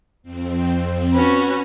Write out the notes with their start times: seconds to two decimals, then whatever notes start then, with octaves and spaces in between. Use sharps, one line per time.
0.23 F2 C4
1.14 C#4 F#4 B4